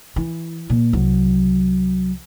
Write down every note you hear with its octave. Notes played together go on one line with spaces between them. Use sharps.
E3
A#2
C2 F#3